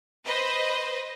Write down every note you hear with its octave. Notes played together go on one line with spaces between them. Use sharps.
B4 C5 D#5